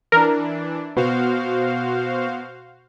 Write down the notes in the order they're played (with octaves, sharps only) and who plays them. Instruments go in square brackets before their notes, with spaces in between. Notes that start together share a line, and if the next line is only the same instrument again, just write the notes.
[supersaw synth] E3 D4 [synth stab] A#4
[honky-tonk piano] B2 [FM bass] B3 [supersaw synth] F#4 C5 F5